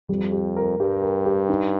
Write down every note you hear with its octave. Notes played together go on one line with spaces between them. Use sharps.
F2 G3
G4
A#4
G2 G4
A#4
G4
D#4